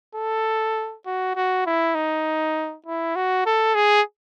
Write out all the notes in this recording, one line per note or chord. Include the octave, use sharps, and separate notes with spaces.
A4
F#4
F#4
E4
D#4
E4
F#4
A4
G#4